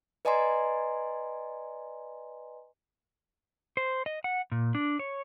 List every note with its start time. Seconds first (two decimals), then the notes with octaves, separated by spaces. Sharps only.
0.25 B4 D5 D#5 G#5 A#5 C6
3.77 C5
4.06 D#5
4.24 F#5
4.52 A#2
4.75 D4
4.99 C#5